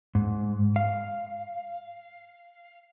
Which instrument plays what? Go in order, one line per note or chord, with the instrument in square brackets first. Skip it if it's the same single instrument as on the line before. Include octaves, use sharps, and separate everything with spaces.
[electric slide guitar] G#2
F5